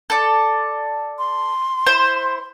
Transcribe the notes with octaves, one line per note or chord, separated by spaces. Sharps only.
A4 D5
C6
E4 C5